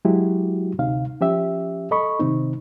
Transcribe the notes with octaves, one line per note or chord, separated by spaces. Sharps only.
F#3 G#3 E4 F#4 G4
D2 C3 D#4 F5
F3 C#4 G4 E5
A4 D#5 B5 C#6
C3 D#3 C4 D#4